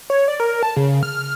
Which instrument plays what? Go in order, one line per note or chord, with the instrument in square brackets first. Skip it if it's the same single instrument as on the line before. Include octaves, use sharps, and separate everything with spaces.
[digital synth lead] C#5
D5
A#4
A5
C#3
F6